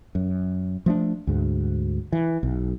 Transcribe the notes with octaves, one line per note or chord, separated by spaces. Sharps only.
F#2
F3 A3 D4
D2 G#2
E3
B1